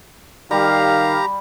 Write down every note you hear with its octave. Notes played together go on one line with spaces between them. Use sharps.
D#3 G3 G4 F5 A#5